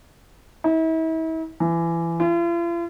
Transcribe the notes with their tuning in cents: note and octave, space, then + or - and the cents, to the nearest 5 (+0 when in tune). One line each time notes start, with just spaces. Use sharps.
E4 -40
E3 +25
F4 -45